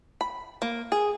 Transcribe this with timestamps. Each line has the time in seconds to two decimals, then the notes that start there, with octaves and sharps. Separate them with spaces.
0.21 B5
0.62 A#3
0.92 G#4